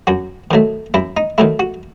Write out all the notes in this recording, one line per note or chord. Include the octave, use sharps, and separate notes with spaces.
F#2 F#4
D#3 F#3 A3
F#2 E4
D#4
D#3 F#3 A3 E4
F#4